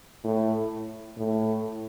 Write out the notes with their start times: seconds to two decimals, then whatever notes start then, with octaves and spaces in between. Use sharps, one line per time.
0.24 A2
1.18 A2